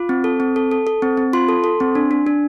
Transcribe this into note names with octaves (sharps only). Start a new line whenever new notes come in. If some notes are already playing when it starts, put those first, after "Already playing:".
Already playing: F4 D6
C4
A4
C4
A4
A4
A4
C4
C4
F4 C6
A4
A4
C4
D4
D4
D4